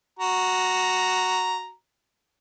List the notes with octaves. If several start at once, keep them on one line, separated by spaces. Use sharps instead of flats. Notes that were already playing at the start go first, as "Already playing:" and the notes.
F#4 A#5